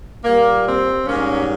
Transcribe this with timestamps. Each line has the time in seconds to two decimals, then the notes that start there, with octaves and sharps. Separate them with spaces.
0.23 A#2 G3 A#3
0.65 C4
1.06 G#2 G3 A#3 C#4